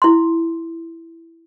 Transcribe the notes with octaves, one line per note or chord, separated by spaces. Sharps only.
E4 C6